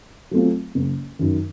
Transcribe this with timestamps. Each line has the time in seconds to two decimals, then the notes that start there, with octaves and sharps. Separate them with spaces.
0.31 F#3 A3 C4 F4
0.75 F#1
1.19 F#2 D#3